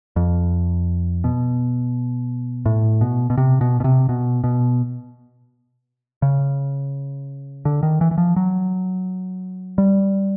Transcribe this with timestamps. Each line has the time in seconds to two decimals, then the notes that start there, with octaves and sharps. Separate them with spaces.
0.16 F2
1.24 B2
2.66 A2
3.01 B2
3.30 B2
3.37 C3
3.61 B2
3.80 B2
3.84 C3
4.09 B2
4.44 B2
6.22 C#3
7.65 D3
7.83 D#3
8.01 E3
8.11 E3
8.18 F3
8.36 F#3
9.78 G3